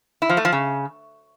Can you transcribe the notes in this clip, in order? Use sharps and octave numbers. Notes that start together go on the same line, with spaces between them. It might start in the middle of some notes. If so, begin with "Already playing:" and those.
E4
F3
A3
F3
C#3